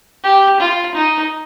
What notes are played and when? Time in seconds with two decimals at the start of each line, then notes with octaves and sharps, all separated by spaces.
0.24 G4
0.60 F4
0.95 D#4